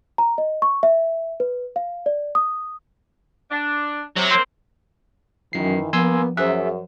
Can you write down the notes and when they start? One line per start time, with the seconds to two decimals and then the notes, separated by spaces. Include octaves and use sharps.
0.18 A#5
0.38 D#5
0.62 C#6
0.83 E5
1.40 B4
1.76 F5
2.06 D5
2.35 D#6
3.51 D4
4.16 C3 F#3
4.31 A#3 C4
5.53 F#2 D#3 E3 C7
5.93 G2 F3 A#3 B3 G#5 C6 E6
6.37 F#2 G#4 C5 E5 F#6